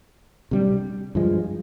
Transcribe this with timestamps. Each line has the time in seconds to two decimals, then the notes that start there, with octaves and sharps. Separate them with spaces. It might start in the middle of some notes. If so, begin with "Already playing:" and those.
0.51 C3 G3 D4
1.15 G2 F3 G#3